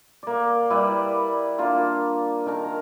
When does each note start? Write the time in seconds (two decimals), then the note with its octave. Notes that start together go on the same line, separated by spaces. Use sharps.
0.23 A#3 D5
0.70 G3 E4 B4 D5
1.59 A#3 D4 F4
2.46 D#3 A#4 A5
2.64 A#5